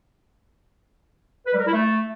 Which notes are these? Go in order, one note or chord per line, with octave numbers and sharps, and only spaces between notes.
B4
G3
A#4
E4
A3